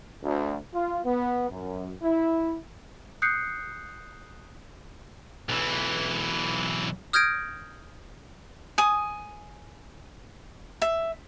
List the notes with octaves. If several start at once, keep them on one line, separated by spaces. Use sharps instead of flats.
D2
F4
B3
F#2
E4
D#6 F#6 G6 C7 C#7
B1 E3
D#6 F6 G6 G#6 A#6 D7
G#5 D#6
E5